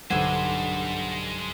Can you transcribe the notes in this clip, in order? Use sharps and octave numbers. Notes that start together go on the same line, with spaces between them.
B1 G2 D3 G#3 C5 F#5 G#5